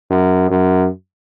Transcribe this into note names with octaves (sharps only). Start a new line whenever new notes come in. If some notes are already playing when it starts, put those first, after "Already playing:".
F#2
F#2